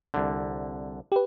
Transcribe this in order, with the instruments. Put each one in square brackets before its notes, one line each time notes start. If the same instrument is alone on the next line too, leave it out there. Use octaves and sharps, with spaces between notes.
[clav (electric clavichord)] C2 D3
[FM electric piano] G4 B4